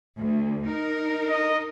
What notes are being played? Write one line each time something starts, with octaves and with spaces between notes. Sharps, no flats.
D2
D#4 A#4
D#5